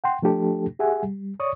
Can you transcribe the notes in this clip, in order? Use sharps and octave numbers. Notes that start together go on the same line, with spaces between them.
F#5 G5 C6
F3 A3 D4 G4 A4
G4 G#4 E5 F#5 G#5
G3
C#5 D5 C#6 D#6